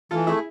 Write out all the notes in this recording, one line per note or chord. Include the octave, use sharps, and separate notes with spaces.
E3 F4 A4
A3 E4 G#4